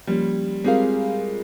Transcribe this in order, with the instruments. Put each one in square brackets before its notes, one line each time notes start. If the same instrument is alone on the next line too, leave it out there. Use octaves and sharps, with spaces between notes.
[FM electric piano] F3 A#3 C#4 [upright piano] G3
[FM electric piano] G3 C4 F4 A#4 F5 [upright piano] G#3